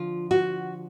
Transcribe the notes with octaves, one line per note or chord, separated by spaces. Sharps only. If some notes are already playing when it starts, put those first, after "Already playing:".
Already playing: D3 F3 F4
F#4